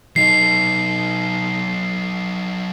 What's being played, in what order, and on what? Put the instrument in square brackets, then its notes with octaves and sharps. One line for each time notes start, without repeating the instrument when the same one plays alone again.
[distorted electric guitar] F#3 D#4 [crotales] C7